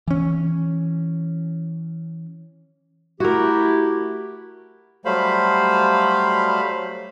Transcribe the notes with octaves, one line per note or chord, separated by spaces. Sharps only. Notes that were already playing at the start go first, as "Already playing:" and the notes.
E3 C#4
A3 E4 F#4 G4 A#4
F#3 G3 A3 C5 F5 B5